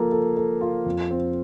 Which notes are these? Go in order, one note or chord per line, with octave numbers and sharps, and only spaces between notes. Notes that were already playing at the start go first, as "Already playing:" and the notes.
Already playing: F3 A#3 A4
A4
A4
F4
F2
C4